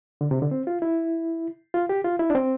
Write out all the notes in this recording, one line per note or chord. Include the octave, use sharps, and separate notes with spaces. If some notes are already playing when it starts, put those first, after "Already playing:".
D3
C3
D3
C4
F4
E4
F4
G4
F4
E4
D4
C4